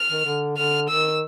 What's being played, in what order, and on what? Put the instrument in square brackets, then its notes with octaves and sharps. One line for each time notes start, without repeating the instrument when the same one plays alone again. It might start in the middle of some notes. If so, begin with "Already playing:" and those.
Already playing: [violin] F6
[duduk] D#3
D3
[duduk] D3 [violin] F6
[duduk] D#3 [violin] E6